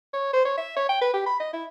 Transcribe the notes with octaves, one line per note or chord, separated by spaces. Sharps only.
C#5
C5
C#5
E5
C#5
G5
B4
G4
B5
D#5
E4